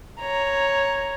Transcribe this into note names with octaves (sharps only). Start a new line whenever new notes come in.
C#5 A#5